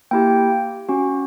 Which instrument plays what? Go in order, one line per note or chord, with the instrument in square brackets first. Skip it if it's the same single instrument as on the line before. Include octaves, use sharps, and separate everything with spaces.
[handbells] A#3 E4 G4 G5
C#4 F#4